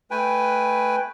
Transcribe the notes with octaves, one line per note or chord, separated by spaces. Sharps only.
A3 B4 G5 G#5